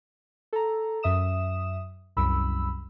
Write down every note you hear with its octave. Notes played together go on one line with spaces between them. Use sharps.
A4 A#5
F#2 E5 D#6 E7
C2 F#2 B5 E6